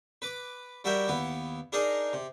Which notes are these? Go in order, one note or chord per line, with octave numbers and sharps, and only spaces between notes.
B4 D6
G3 F#4 A#4 E5 G5
D#2 B3 E4
D4 D#4 G#4 A#4 D#5
C3